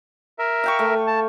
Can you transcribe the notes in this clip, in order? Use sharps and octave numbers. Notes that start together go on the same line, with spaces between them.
A#4 E5
F5 G5 C#6
A3
A5